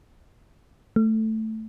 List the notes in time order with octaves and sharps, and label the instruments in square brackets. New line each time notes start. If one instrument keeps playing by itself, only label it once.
[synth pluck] A3